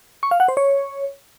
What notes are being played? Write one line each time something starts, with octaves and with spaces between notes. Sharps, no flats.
C#6
F5
F#5
C5
C#5